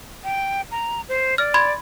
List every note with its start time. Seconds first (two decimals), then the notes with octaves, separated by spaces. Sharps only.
0.24 G5
0.71 A#5
1.09 C5
1.38 D5 F6
1.54 B5 C6 G#6